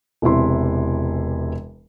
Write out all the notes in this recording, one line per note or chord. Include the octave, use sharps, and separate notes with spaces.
E1 E2 C3 E4 C6